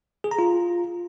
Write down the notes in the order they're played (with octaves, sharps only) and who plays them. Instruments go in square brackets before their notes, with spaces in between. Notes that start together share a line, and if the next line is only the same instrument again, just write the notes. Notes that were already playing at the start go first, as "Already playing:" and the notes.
[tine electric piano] G#4
A#5
F4